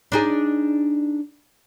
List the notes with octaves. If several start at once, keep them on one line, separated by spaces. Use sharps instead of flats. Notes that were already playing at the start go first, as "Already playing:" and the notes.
D4 D#4 G#4